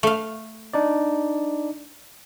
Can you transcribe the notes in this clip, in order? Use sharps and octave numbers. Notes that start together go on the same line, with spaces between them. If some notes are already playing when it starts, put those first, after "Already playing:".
A3 F5
D4 D#4 D5